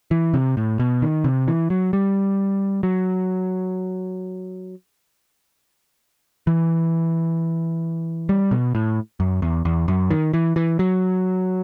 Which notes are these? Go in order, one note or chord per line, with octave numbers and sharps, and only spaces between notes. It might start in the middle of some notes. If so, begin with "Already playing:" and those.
E3
C3
A2
B2
D#3
C3
E3
F#3
G3
F#3
E3
G3
B2
A2
F#2
E2
E2
F#2
D#3
E3
E3
F#3